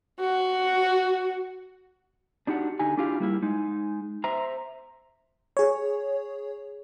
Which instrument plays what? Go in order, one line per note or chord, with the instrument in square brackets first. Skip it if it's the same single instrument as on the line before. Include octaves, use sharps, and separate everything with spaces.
[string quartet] F#4
[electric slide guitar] D4 D#4 F#4 G4 F#5
D3 D#4 G4 G#5
D4 E4 F4 G4 G#4 F5
G3 A#3 E4
G#3 D#4
C5 E5 A#5
[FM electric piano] G#4 C#5